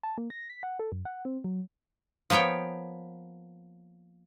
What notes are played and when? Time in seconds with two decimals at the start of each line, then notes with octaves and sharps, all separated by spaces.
0.03 A5
0.18 A#3
0.30 A#6
0.50 B6
0.63 F#5
0.79 A4
0.92 F#2
1.05 F#5
1.25 C4
1.44 F#3
2.30 F3 A#3 B3 C#5 G5